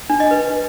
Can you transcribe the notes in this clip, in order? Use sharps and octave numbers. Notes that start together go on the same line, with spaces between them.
D4
D#5
B4